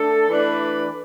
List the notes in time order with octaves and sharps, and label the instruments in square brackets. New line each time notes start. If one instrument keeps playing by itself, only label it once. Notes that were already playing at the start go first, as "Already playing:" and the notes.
Already playing: [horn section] A3 D4 A4
E3 A3 D4 B4 D5